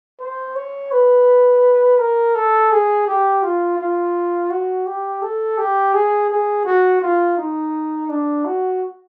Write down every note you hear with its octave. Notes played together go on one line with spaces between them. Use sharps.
C5
C#5
B4
A#4
A4
G#4
G4
F4
F4
F#4
G4
A4
G4
G#4
G#4
F#4
F4
D#4
D4
F#4